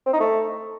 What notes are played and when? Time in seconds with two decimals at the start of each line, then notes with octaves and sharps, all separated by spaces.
0.06 C4
0.13 D#4
0.20 A3